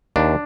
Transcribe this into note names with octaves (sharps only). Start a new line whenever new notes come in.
D#2 D4